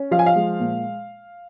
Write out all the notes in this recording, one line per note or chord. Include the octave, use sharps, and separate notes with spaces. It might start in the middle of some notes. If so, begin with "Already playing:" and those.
Already playing: C#4
F3 F5
G#5
F5
G#3
A#2